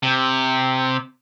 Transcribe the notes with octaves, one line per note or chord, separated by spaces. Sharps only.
C3